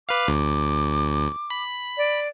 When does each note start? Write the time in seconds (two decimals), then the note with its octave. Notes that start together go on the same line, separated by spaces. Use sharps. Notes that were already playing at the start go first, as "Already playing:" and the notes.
0.09 B4 F5 D6
0.28 D2
1.50 B5
1.97 D5